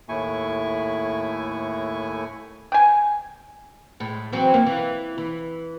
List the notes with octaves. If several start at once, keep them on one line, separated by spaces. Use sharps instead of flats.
D#2 A2 A3 E4 G#5 C#6
G5 G#5
A2 G#3
E3 F#3 C4
A#3 C#4
E3
E3